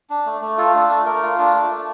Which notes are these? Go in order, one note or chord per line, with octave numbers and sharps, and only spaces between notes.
D4
A3
A3
F4 A4
D4
A3
A3 A#4
F4
D4
A3
A3